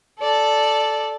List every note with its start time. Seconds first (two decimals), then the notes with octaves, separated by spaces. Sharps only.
0.19 A4 D5